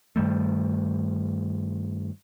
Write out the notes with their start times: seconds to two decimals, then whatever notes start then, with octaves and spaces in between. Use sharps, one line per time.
0.16 G2 D#3 G3 A3